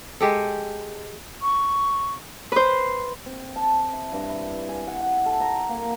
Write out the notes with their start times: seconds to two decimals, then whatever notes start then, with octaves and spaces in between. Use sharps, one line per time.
0.20 G#3 G4 A4
1.42 C#6
2.52 B4 C5
3.26 C4
3.56 A5
3.93 E4
4.12 G2
4.29 E4
4.69 G#5
4.88 F#5
5.01 F#5
5.26 A4
5.41 A#5
5.69 A#3